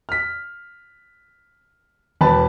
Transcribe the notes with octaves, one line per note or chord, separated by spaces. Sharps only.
F6 B6
E1 B4 A5